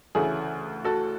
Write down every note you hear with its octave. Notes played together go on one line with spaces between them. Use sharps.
D2 C#3 E3 A3 G#4
F#4 A4